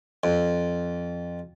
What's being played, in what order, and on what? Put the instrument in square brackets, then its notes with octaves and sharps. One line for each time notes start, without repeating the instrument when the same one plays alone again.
[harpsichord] F2